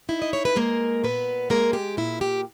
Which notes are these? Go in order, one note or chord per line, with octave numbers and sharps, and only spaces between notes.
D#4 E4
D#5
C#5
B4
G#3 A#3 A#4
A#2 B3 B4
G#3 A#3 A#4
G4
A#2 E4
G4